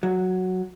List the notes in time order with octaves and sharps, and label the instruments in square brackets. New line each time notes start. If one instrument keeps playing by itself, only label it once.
[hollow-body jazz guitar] F#3